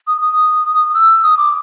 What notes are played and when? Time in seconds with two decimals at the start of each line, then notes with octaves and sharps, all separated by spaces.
0.07 D#6
0.22 D#6
0.94 E6
1.23 D#6
1.37 D6